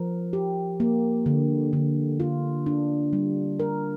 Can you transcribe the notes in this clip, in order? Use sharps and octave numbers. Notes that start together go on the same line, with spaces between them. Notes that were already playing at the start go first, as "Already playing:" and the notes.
Already playing: F3 A#4
G4
A#3
D3
D3
F4
D4
G3
A#4